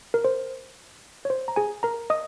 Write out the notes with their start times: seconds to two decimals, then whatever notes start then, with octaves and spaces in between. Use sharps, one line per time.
0.14 A#4
0.25 C5
1.25 C#5
1.30 C5
1.48 A#5
1.56 G#4 G#5
1.83 A#4 A#5
2.10 D#5 D#6